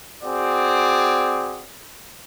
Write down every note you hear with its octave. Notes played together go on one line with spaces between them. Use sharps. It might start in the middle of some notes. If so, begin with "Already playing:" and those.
C4 F#4 G#4 D5